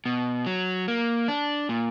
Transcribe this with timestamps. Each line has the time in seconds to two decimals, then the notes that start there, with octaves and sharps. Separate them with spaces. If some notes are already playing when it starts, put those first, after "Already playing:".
0.06 B2
0.46 F#3
0.88 A#3
1.28 D4
1.69 A#2